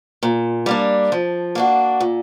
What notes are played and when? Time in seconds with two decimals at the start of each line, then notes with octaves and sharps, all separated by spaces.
0.23 A#2
0.66 G3 A#3 D4
1.12 F3
1.55 A#3 D4 F#4
2.00 A#2